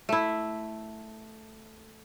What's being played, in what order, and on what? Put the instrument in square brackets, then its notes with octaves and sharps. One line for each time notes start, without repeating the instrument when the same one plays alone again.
[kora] A3 E4